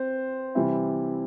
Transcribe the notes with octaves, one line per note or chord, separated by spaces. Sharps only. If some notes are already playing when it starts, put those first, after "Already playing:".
Already playing: C4 C5
C3 E3 G3 C4 E4